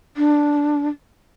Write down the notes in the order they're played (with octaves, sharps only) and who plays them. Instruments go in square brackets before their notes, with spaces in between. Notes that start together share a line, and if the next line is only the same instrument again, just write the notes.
[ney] D4